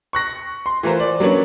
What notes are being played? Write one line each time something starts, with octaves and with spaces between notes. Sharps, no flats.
C#6 F#6 A#6
C6
E3 A3 F4 A#4 C5
D5
F#3 A#3 C#4 D4 B4 C#5